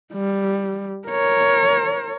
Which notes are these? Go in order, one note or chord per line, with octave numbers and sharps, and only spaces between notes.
G3
A#4 C#5